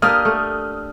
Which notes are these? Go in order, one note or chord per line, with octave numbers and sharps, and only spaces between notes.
A#3 D4 G4 D#6 F6
A3